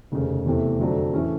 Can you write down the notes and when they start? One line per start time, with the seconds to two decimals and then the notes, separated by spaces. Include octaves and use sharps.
0.12 F1 D#2 C#3
0.45 E2 C3 E3 A3
0.79 F2 D3 F#3 A3 D4
1.14 A2 E3 A3 C#4